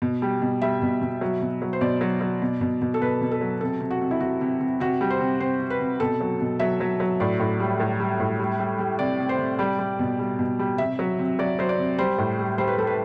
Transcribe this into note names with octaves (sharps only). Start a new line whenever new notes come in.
B2
G3
B2
G3 E5
B2
B2
F#3
B2
F#3
C5
B2 D5
F#3
F#3
B2
B2
B2
A4
B2 B4
B2
A4
F#3
C3 A4
C3
F#4
C3
E4
C3 F#4
C3
C3
C3 F#4
G3
C5
C3
C3 C5
C3
B4
C3
B2 A4
F#3
B2
F#3 E5
F#3
F#3
A2 D5
A2
G3
A2
G3
A2
G3
G3
G3
C3 D5
C3
C5
C3
G3 D5
G3
B2
G3
B2
G3
C3 E5
F#3
C3
F#3 D5
F#3 C5
D5
C3
G3 C5
A2
G3
G3 C5
B4
G3 A4
B4